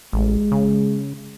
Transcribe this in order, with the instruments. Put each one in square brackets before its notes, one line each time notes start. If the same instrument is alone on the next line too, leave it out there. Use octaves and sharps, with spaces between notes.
[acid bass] A1 [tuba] G#3
[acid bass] C#3